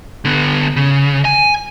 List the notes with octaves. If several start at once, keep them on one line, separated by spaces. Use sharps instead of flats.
D3 B3
C#3
G#5